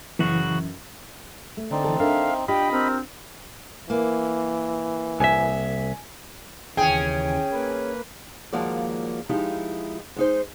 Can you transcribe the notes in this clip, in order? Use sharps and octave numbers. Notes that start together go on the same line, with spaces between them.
F#2 C#3 E3 F#4
A3
D3 C4 D#4 D5
E3 A4
D4 A4 A#4 E5 F5
D4 F4 G4 D#5 G5 B5
C4 A#4
E3 A#3
C2 E5 G#5
D#2 C#3 E3 C#4 G#4 G5
A#3 B4
D#2 F3 G#3 A#3 F#4 D5
F3 G#3 D#4 E4 G4
G#3 D#4 C5